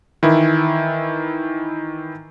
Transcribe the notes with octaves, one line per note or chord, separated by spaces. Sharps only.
D#3 E3 E4